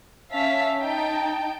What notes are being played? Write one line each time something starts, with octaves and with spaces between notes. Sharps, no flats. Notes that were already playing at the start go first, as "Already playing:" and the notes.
C#4 E5 F5 A5 B6
D#4 G5 A5